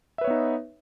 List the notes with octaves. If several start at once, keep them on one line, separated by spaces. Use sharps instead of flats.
B3 D#4 B4 C#5 E5